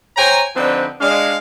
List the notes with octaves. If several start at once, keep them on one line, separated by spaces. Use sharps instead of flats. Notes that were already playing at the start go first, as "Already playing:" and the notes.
C5 C#5 G5 G#5 A#5
D3 F3 C4 D4 D#4 B4
G#3 D4 F5